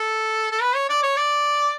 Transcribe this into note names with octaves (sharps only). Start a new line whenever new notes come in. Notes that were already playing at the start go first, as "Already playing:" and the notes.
Already playing: A4
A4
B4
C#5
D5
C#5
D5